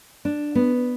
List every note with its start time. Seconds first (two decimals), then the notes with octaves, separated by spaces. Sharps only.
0.25 D4
0.55 B3